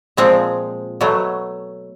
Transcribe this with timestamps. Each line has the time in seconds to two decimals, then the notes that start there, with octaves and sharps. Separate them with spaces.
0.17 A#2 F3 G#3 C4
1.01 B2 F#3 A3